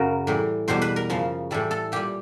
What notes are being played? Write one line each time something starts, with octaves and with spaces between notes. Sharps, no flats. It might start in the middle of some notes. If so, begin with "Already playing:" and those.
Already playing: F#2 C#3 F#3 A#4
A2 E3 G3
E2 B2 G3 C5
B4
A#4
F#2 C#3 F3
A2 E3 G3 A4
A4
A#2 G3 G4